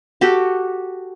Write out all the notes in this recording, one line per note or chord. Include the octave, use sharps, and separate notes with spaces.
F#4 G4 A4